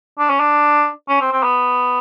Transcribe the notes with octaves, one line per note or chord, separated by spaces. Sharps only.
D4
C#4
D4
C#4
C4
C4
B3